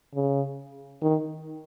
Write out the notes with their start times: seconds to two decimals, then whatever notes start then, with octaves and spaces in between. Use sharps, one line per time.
0.15 C#3
1.02 D#3